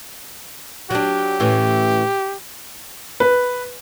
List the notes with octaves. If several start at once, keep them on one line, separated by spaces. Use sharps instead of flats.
F#3 D4 G4
A2 E3 C#4
B4